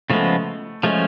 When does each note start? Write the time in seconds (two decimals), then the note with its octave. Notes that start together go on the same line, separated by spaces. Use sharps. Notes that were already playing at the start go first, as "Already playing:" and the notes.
0.10 C#3 F3 G#3 A3 B3
0.83 F3 G#3 A3 C#4